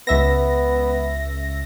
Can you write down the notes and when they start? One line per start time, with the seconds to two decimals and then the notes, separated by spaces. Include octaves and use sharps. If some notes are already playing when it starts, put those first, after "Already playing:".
0.07 C#2 B3 E5 A#6